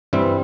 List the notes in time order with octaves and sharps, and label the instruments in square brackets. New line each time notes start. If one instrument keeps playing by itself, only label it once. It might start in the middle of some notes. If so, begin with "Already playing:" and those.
[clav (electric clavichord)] G2 E3 G3 C4 E4 E5